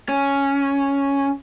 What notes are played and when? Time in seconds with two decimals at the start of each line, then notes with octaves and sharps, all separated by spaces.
0.09 C#4